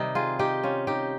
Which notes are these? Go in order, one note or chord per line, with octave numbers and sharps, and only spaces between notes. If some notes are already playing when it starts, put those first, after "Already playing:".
Already playing: C3 D#3 G3 D#4
F4 G#4
D#4 G4
C#4 F4
D#4 G4